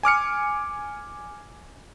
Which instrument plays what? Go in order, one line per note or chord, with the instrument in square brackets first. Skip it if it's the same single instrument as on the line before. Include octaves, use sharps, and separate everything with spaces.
[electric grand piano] G#5 D6 F6 C#7